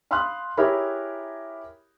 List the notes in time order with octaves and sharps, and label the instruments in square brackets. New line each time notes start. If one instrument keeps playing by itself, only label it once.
[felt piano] F5 B5 C6 D#6 F6 F#6
E4 G4 G#4 A#4 C#5 B5